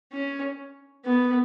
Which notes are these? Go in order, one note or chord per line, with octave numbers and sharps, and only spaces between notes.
C#4
B3